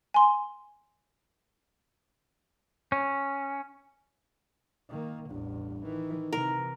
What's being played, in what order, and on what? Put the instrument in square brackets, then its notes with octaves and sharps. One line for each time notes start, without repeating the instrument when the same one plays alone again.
[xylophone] G#5 C6
[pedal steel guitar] C#4
[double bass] D#3 A#3
[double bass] A1 E2 [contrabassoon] G2
[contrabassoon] D#3 [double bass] E3
[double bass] C3 E3 [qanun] A#4